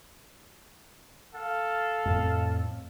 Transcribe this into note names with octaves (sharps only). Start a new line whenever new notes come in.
A4 F5
F2 A2